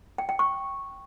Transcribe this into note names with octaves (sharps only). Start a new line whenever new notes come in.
G5
G5
C#6